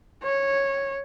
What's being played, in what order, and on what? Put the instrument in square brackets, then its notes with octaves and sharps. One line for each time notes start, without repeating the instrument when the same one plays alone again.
[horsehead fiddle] C#5